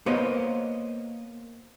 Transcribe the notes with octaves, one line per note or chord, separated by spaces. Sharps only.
A#3 B3 C5 C#5 D#5